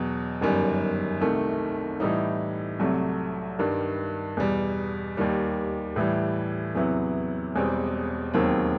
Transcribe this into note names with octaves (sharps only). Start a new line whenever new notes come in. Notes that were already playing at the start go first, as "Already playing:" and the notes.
Already playing: E2 B2 F#3
G1 F#2 D#3 G3
C2 C3 D#3 A3
A2 E3 G3 D#4
C2 C3 F#3 A3
G2 D#3 G3
E2 B2 G3
D#2 D#3 G3
A2 E3 G3
E2 C3 F#3 B3 E4
E1 E2 B2 G3 C4
E1 D#2 D#3 F#3 C4